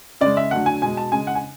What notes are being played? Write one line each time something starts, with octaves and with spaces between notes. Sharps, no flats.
C#3 G#3 D5
E5
D3 F#3 A3 F#5
G#5
B2 G#3 G#5
A5
C#3 G#3 G#5
F#5
G#5